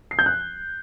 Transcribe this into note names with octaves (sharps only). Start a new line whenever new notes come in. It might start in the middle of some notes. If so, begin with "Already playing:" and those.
C7
G6
F#6